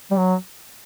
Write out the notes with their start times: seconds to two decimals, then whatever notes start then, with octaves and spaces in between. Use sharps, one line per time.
0.11 G3
0.17 F#3